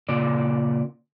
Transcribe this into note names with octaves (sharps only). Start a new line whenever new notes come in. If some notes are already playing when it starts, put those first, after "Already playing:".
A#2 C#3 D5